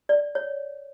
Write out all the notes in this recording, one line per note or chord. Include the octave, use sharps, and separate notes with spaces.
D5
C#5